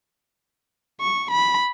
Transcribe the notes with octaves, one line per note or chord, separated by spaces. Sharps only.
C#6
B5